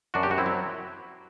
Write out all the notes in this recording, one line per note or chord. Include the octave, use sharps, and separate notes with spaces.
F#2 D4 F#4
G4
F#2 F#4
C4 E4
F#3